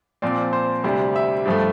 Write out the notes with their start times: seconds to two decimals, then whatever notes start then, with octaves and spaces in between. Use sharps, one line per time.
0.22 A#2 F3 C4 D5
0.53 C5
0.84 D2 C3 G3 D4 C5
1.16 E5
1.46 G2 F3 A3